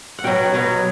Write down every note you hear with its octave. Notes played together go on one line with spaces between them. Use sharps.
F#5
B2 F#3 B3 G5
B2 F#3 B3